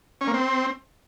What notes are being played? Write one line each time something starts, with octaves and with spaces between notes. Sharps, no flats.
C#4
A#3
C4